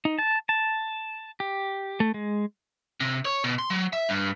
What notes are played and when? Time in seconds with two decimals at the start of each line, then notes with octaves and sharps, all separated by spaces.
0.05 D#4
0.19 A5
0.49 A5
1.40 G4
2.00 A3
2.14 G#3
3.00 C3
3.25 C#5
3.44 B2
3.59 C6
3.70 F#3
3.93 E5
4.09 G2